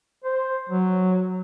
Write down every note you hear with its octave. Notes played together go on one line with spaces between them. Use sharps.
C5
F#3